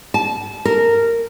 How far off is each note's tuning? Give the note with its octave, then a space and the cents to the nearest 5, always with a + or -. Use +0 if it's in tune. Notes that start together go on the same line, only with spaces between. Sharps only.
A5 -25
A#4 -10